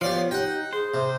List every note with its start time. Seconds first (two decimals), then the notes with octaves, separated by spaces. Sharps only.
0.01 F3 B3 G4 C#5 D5 F5
0.31 D#4 G4 F#5 G5
0.73 G#4 C5
0.94 C3